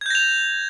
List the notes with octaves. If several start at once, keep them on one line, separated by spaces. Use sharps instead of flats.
G6 G#6 A#6 F7